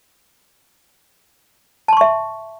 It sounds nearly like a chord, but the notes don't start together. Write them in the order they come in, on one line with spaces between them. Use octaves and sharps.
A5 C6 C#6 E5